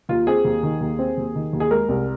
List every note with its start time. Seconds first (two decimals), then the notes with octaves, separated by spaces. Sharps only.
0.09 D#2 F4
0.27 C4 G#4
0.45 D#2
0.63 D#3
0.81 D#2
0.99 C4
1.17 D#2
1.35 D#3
1.53 D#2
1.60 G#4
1.71 G#3 A#4
1.89 C2